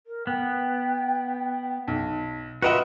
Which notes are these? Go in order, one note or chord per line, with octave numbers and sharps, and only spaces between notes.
A#4
B3 G5
B1
F4 F#4 A#4 B4 D#5 E5 F#5